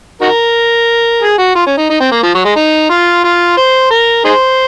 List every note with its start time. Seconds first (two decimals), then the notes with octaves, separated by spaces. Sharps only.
0.21 D#4 F#4 A#4
1.22 G#4
1.38 F#4
1.55 F4
1.67 C#4
1.78 D#4
1.90 D#4
2.00 C4
2.12 A#3
2.23 F3
2.35 F#3
2.45 G#3
2.56 D#4
2.90 F4
3.24 F4
3.57 C5
3.91 A#4
4.25 D#4 G#4 C5